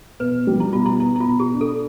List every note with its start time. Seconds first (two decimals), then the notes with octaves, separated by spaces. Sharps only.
0.20 B2 B4
0.47 G3
0.60 E4
0.73 B2 F4
0.86 E4
1.00 B3 E4
1.16 E4
1.20 F4
1.27 B2
1.40 G4
1.54 D4
1.61 A4